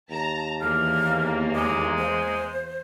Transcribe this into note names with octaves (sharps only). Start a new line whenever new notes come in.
D#2 A5 A#5
E2 A#3 F6
G#3 D6
C5